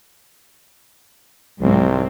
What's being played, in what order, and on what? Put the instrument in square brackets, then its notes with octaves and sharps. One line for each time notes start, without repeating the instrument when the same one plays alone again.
[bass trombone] C2 [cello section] G#2 F#3 C4